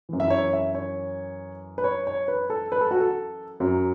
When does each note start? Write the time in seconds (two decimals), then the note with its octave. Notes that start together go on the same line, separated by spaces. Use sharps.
0.09 F#2 E3
0.20 E5
0.30 C#5
0.53 E5
0.75 C#5
1.78 B4
1.84 C#5
2.07 C#5
2.28 B4
2.50 A4
2.72 B4
2.81 A4
2.91 F#4
3.00 A4
3.60 F#2 F#3